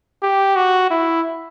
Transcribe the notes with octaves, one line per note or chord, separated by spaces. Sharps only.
G4
F#4
E4